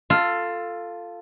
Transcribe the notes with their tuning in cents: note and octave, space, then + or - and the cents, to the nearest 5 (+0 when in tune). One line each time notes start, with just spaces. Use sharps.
F4 +0 A4 +15